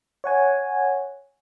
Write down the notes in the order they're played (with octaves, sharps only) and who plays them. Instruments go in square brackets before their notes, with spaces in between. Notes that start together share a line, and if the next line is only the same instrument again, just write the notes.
[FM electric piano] C#5 F#5 G#5